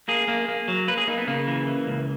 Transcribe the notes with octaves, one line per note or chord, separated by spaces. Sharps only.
A#3 G#4
A#3
A#3
F#3
A#3 B4
G#4
A#3 D#4
B3
C#3 A#3
E3
E3
C#2